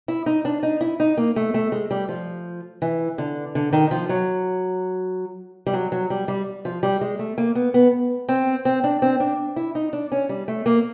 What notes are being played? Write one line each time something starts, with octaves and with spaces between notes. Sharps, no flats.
E4
D#4
D4
D#4
E4
D#4
A#3
A3
A3
G#3
G3
F3
E3
D3
D3
D#3
F3
F#3
G3
F#3
F#3
G3
G3
F3
G3
G#3
A3
A#3
B3
B3
C4
C4
D4
C4
D4
E4
D#4
D4
C#4
G3
A3
A#3